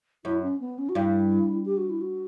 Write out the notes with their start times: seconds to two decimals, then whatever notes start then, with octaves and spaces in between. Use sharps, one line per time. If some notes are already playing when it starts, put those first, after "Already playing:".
0.25 F#2 E4
0.42 C#4
0.60 B3
0.78 C#4
0.89 F#4
0.95 G2 E4
1.66 G4
1.77 F#4
1.90 E4
2.01 F#4